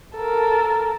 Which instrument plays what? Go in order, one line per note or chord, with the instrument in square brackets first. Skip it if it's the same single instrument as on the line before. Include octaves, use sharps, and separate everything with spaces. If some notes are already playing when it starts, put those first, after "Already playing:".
[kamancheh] A4 A#4